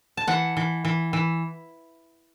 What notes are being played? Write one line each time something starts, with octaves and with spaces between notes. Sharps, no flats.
A5
E3 F#5
E3
E3
E3